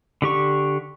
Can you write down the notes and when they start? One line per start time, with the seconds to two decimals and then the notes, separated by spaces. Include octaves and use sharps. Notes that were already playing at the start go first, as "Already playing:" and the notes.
0.22 D3 G4 C#6